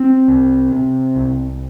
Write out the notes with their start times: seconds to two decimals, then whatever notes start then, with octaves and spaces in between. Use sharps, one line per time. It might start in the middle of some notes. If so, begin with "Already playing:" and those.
Already playing: C4
0.28 C2
0.72 C3
1.16 C2